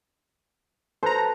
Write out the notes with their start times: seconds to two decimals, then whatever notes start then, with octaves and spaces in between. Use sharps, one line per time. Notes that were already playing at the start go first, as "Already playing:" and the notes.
1.03 A4 B4 C5 A#5